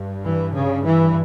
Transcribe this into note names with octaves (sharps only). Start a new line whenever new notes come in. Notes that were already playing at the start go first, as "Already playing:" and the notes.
Already playing: G2
E3
C#3
E3